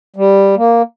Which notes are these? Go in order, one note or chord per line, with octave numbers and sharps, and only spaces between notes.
G3
A#3